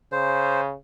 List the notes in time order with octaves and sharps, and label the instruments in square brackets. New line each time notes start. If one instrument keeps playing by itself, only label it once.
[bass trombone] C#3 [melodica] C5